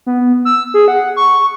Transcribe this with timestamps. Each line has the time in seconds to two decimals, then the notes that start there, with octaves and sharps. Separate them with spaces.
0.06 B3
0.45 E6
0.74 G#4
0.88 F#5
1.16 C#6